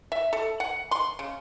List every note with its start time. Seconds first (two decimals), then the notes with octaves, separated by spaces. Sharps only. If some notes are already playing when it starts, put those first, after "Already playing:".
0.12 E5
0.33 A4
0.60 F#5
0.91 C6
1.19 C#3